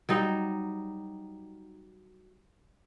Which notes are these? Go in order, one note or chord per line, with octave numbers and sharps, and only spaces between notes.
F#3 G3 D#4